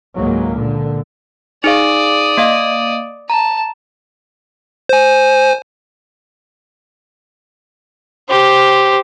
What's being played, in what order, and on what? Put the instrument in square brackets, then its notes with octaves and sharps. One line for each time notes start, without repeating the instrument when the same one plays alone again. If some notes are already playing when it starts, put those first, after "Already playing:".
[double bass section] C#2 G#2 F#3 A#3
A#2 D3
[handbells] D#4 G#4 F5 [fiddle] D5 D#6
[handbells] A#3 D#5 F5
[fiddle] A5 [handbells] A#5
[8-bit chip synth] C5 G#5
[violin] G4 C5